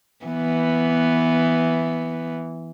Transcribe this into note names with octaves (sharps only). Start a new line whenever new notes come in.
E3 B3